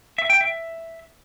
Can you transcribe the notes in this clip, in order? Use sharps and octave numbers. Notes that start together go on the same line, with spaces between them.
E5
G5
E5